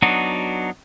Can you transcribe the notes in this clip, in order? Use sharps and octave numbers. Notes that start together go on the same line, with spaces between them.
F#3 B3 D4 D#4 F#4